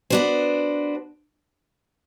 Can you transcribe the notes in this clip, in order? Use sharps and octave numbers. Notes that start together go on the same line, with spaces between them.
B3 D4 F#4 C5